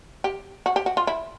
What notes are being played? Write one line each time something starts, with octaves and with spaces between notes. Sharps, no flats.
G4
F#4
G4
F#4
F4
E4